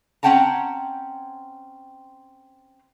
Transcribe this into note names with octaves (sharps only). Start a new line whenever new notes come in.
C4 C#4 F#5 G5 A5 A#5